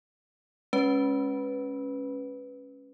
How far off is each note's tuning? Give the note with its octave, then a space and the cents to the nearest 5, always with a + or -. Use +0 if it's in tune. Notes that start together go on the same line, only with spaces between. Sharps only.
G#3 +0 C#4 -10 B4 +0